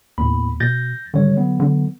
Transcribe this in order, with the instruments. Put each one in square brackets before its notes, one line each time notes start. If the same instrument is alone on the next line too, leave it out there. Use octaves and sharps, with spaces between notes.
[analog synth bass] D#2 [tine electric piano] A2 B3 B5
[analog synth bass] B2 [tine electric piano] G6 A6 A#6
[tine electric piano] G#1 G3 C#5 [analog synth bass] D3
[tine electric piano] F#3 B3
[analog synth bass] D3